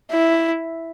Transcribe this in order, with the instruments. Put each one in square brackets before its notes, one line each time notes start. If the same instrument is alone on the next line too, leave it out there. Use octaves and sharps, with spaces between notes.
[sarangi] E4